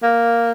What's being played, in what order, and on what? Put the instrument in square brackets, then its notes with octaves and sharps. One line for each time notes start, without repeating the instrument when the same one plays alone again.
[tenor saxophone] A#3